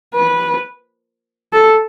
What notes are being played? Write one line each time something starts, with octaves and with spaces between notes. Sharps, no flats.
B4
A4